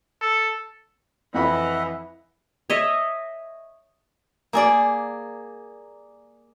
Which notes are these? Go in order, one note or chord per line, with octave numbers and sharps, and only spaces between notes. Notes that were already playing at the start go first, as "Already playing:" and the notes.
A4
F2 E3 D#5 E5 F#5 B5
C#5 D#5 E5
A#3 G#4 D5